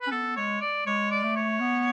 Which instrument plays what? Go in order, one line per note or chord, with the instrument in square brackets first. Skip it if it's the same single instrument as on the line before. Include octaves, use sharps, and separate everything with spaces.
[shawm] B4
[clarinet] C#4
[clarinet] B3 [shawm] A4
[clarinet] G#3 [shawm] C#5
[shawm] D5
[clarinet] G#3 [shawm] C#5
[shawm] D5
[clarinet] A3
[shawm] C#5
[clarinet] B3